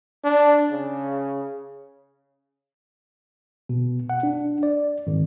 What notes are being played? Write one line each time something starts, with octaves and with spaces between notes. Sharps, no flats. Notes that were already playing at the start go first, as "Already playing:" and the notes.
D4
C#3
B2
F#5
D4
D5
G#1